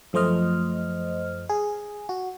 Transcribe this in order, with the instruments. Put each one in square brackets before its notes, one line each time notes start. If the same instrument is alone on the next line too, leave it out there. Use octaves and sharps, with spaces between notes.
[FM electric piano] F#2 F3 A3 C5 D#5 F6
G#4
F#4